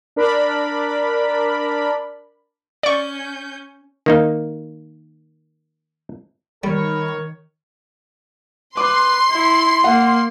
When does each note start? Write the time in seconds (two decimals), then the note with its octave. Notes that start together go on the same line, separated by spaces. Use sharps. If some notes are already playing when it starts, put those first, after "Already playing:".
0.16 D4 A#4 D5 B5
2.83 C#4 D5 C#6 G6
4.06 D#3 A#3 D#4
6.64 D#3 G3 A#4 C#5 B5
8.77 B4 C6 D6
9.31 E4
9.84 A#3 F#5